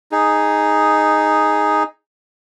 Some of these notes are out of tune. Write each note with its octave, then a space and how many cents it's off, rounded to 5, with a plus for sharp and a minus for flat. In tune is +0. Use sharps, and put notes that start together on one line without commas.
D#4 +0 G#4 +0